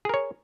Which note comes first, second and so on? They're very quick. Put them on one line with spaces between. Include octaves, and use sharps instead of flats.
G#4 A#4 C#5